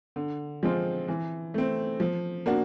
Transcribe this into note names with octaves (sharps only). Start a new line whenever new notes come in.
D3
F3 G#3 C4 F4
E3
A3 C4
F3
A#3 D4 F#4